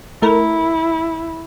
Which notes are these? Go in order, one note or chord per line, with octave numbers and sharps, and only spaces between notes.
A3 E4 A#4